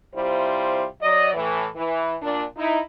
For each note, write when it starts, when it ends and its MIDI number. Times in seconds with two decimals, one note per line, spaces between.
0.14 0.84 48
0.14 0.84 55
0.14 0.84 64
0.14 0.84 65
0.14 0.84 72
1.02 1.34 54
1.02 1.34 74
1.02 1.34 75
1.34 1.66 45
1.34 1.66 52
1.74 2.14 52
2.21 2.43 46
2.21 2.43 62
2.57 2.78 63
2.57 2.78 64